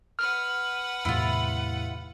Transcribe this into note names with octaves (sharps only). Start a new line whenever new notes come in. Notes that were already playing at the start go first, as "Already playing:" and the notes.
B4 F#5 F6
E2 A2 C3 E4 F4